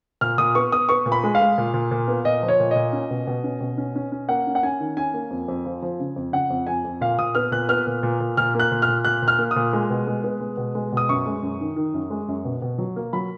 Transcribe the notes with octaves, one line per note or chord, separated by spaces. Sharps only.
A#2 F6
A#2 D#6
B3 C#6
B3 D#6
B3 C#6
A#2
B5
G#3
F5
G#3
A#2
A#2
A#2
B3
A#2 D#5
F3
C#5
A#2
A#2 D#5
C#4
B2
B2
C#4
B2
C#4
C#4
C#4
A#3 F#5
C#4
F#5
C#4 G#5
D#3
C#4 G#5
A#3
F2
F2
F3
F3
C#3
F2
C#3 F#5
F2
F2 G#5
F2
A#2 F5
A#2 D#6
B3 F6
A#2 F#6
B3 F6
A#2
A#2
A#2
A#2 F6
A#3 F#6
A#2
F6
A#2
A#2 F#6
A#2
F6
A#3
D#6
A#2
G#3
B2
G#3
B3
G#3
B2
G#3
B2 D#6
F#2 C#6
G#3
F#2
D#3
D#3
F#2
G#3
F#2
B2
B2
F#3
A#3
F#3 B5